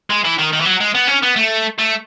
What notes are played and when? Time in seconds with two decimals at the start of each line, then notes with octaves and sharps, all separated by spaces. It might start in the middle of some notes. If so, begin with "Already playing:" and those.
0.10 G#3
0.24 E3
0.38 D#3
0.52 D#3
0.60 E3
0.65 F#3
0.80 G#3
0.95 B3
1.08 C#4
1.23 B3
1.36 A3
1.78 A3